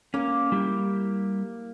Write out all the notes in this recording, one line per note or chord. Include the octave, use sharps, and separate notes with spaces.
A#3 C#4
G3 E4 G4